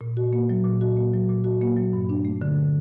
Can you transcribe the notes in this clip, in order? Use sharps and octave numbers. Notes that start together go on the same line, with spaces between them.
A#2
F#4
A#3
F#3
A#2
F#4
A#3
F#3
A#2
F#4
A#3
F#3
G2
D4
A3
D3